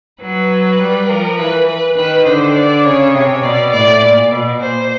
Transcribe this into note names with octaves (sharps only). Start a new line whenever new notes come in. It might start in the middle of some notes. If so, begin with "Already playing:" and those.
F#3 B4
G3
F3 A#4
E3 B4
B4
D#3 B4
D3 C5
D5
C#3 C#5
C3 C#5
B2 D5
A2 D5
A#2
B2
A#2 C5